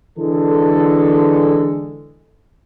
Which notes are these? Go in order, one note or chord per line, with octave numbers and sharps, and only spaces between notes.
D3 E3 G#3 A4